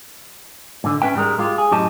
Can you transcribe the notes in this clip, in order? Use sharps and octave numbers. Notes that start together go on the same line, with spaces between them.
G#2 D3
C#4 B4 E5 G5
G#2 G3 G#3 A#4
G#3 F4 G4
G#4
F#2 A2 G4 D#5 A5